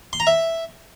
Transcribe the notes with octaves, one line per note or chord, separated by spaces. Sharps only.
C6
A#5
E5